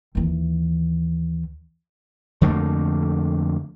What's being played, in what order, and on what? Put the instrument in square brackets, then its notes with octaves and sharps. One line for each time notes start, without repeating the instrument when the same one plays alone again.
[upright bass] D#2 E3
[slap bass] F2 D3 A3 A#3